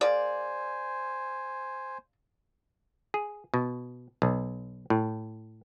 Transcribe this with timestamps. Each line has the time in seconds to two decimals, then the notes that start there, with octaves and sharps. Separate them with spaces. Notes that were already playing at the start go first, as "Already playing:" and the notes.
0.01 A#3 G#4 C5 D5 G#5
3.14 G#4
3.54 B2
4.22 B1
4.90 A2